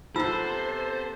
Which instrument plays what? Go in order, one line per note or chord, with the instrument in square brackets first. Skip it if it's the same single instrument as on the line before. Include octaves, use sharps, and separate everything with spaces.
[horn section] C3 A5 [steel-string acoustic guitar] B3 A4 [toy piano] F4 E6 [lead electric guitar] C5